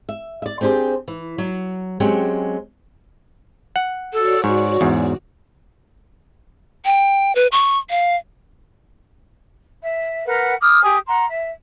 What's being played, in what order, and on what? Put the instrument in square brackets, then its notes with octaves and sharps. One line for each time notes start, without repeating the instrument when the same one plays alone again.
[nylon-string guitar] E5
D5 E5
C4 D4 G4 G#4 C5
E3
F#3
F#3 G#3 C4 C#4 G4
[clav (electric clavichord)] F#5
[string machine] F#4 C#5 D5 [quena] A4
[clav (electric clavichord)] G#2 [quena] C#6
[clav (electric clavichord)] E2 G#2
[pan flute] G5
B4
C#6
F5
[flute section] E5
A#4 B4 F#5
D6 D#6 F6
G4 G#5 D#6
F#5 A#5 C6
E5